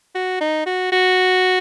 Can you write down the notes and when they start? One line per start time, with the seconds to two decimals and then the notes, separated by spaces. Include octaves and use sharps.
0.15 F#4
0.41 D#4
0.66 F#4
0.92 F#4